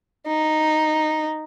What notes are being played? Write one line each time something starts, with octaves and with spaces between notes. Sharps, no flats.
D#4